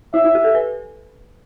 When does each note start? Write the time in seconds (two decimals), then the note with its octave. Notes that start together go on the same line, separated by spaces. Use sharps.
0.14 E4 E5
0.24 E4
0.35 G4
0.44 A4
0.55 B4